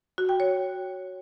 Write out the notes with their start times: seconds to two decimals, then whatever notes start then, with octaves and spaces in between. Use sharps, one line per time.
0.18 F#4
0.29 G5
0.40 C#5